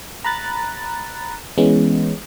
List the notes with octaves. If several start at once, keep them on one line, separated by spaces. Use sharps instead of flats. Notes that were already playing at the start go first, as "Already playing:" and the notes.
A#5 B5 F#6 A6
E3 G#3 B3 C#4